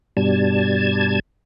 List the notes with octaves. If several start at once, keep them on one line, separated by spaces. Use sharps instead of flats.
G2 B2 G3 A5 G#6